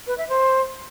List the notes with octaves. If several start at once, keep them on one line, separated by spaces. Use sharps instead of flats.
B4
E5
C5